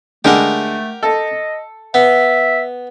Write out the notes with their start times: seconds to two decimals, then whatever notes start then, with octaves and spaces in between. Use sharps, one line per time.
0.25 D3 G#3 A3 G4 A#4 F#5
1.03 A4 D#5
1.94 B3 E5